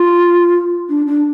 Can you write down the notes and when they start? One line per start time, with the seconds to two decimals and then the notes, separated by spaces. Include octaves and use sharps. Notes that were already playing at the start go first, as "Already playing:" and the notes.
Already playing: F4
0.89 D4
1.07 D4